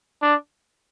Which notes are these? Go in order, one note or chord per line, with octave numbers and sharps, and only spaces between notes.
D4